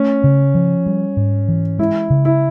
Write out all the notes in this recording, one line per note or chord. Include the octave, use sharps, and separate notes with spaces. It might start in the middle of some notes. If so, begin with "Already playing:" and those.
Already playing: A3 C#4
C#3
F3
G3
G#2
E3
G#3 E4
C#3
E4